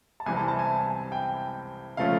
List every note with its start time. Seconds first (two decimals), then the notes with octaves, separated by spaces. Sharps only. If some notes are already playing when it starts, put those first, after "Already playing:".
0.20 A5
0.26 C2 C3 E3 G3 C4 G#5
0.37 A5
0.48 A5
0.59 G#5
1.12 G5
1.97 C#3 F3 A3 C#4 F5